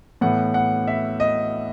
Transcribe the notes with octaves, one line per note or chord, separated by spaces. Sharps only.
A2 E3 B3 F#5
F#5
E5
D#5